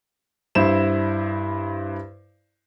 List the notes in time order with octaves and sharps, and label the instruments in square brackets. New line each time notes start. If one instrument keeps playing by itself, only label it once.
[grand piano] G2 E4 C5 E7